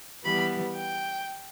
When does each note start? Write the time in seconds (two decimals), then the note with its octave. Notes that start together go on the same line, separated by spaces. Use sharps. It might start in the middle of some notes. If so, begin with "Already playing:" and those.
0.24 E3 G3 B3 B5
0.75 G5